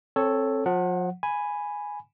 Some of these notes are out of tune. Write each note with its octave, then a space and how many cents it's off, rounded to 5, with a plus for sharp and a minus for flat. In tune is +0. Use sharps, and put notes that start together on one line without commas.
C4 +20 A4 +0 C#5 +0
F3 +40 F#5 +0
G#5 +0 B5 +0